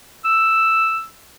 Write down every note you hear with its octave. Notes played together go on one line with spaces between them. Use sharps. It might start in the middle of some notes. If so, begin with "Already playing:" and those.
E6